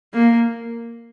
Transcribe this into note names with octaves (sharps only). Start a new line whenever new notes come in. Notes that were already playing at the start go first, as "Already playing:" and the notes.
A#3